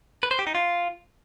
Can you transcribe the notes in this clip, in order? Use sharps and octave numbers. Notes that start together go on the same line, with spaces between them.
B4
C5
G4
D#4
F4